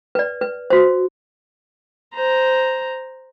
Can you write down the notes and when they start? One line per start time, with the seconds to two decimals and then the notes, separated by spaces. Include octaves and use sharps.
0.15 B4 D5
0.41 B4
0.70 F#4 C5
2.14 C5 A#5